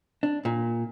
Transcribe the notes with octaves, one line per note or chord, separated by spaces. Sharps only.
D4
A#2